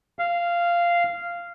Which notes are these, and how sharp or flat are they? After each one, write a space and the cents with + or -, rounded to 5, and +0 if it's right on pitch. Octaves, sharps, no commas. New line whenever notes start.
F5 -10